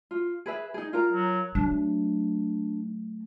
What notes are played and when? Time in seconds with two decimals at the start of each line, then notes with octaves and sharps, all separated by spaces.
0.11 F4
0.46 G#4 B4 E5
0.74 D#4 G#4
0.93 F4 A#4 A#5
1.12 F#3
1.55 F#3 A3 D4